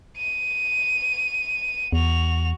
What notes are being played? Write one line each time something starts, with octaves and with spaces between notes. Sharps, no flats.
D#7
E2 F#4 F7